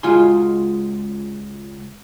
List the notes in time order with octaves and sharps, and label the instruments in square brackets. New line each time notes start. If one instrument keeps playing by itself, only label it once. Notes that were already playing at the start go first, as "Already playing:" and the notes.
[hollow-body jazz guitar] C#2 G#3 F4 F#4 G#5 C6